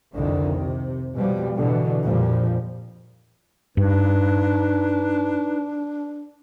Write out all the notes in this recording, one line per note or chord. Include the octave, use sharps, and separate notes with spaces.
C2 F2 D3 D#3
C3
B2 F3 G3
B2 D3 E3
F2 A#2 F3 G3
G2 D4 D#4 B4